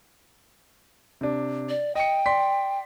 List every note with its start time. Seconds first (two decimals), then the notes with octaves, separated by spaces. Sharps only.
1.21 C3 D4
1.69 D5
1.95 D#5 G5 C#7
2.26 D5 C6 B6